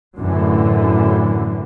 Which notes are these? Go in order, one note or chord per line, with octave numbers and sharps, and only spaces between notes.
F#2 A2 D3 E3